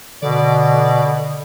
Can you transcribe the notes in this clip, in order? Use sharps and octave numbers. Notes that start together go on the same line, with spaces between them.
B2 D3 D5